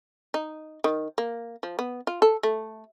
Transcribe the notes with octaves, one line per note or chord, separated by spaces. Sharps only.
D#4
D#3
A#3
F3
B3
F4
A4
A3